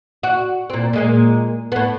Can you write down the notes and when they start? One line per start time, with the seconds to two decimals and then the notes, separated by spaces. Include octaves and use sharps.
0.23 F#4
0.70 A#2 C4
0.93 A#2 G#3 A#3
1.72 A2 B3